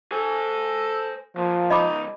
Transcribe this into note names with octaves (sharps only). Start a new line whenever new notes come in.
A4 C5 G#5
A#2 F3
C#2 G#2 D#4 D#5 B5 D6